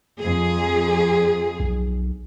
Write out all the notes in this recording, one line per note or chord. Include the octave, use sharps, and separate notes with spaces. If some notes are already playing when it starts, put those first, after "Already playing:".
F2 G#4
B1